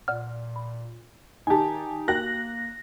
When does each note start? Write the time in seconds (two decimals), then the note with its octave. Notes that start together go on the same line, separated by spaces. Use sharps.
0.08 A#2 D5 F#5 F6
0.56 B5
1.47 D#3 D#4 G4 G#5 A5
2.08 A#3 F#4 A#4 G5 F#6 A#6